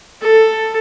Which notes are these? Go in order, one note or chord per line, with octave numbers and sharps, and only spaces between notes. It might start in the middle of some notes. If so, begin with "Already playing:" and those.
A4